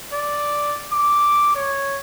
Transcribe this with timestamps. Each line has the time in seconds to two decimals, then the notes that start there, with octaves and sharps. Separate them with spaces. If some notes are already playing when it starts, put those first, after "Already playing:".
0.13 D5
0.93 D6
1.56 C#5